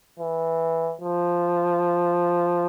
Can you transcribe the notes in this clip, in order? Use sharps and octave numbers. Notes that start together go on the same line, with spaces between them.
E3
F3